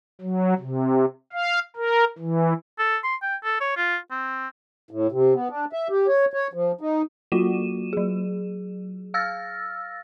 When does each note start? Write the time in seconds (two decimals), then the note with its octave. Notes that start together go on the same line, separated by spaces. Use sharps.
0.21 F#3
0.59 C3
1.33 F5
1.76 A#4
2.19 E3
2.79 A4
3.04 C6
3.22 G5
3.44 A4
3.61 C#5
3.77 F4
4.11 C4
4.91 A2
5.12 C3
5.34 B3
5.50 D4
5.73 E5
5.90 G4
6.08 C#5
6.34 C#5
6.53 F3
6.81 D#4
7.32 F#3 A#3 F4 F#4 D#7 E7
7.93 F#3 G#4
9.14 F5 E6 F6 A6 A#6